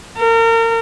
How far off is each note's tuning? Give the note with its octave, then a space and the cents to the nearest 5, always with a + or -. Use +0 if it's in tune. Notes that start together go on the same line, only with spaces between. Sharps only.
A#4 -35